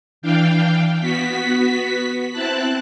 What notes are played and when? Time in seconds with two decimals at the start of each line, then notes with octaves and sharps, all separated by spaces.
0.22 E3 D4 F5 G5
1.00 B3 F#4 B6
2.31 C4 E4 A5 F#6